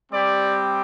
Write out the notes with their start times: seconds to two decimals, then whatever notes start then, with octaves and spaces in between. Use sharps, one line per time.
0.11 G3 C4 G4 D5